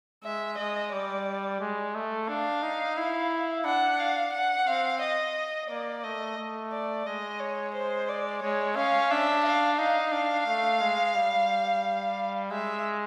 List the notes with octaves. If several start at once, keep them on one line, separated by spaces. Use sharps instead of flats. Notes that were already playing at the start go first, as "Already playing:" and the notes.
G#3 E5
G#3 D#5
G3 D5
G#3
A3
D4 F5
D#4
E4
D4 F#5
F5
F#5
C4 F5
D#5
A#3 D5
A3 D#5
A3
D5
G#3 D#5
C#5
C5
D5
G#3 C#5
C#4 F5
D4 E5
F5
D#4 F5
D4
A3
G#3
G3
G#3 E5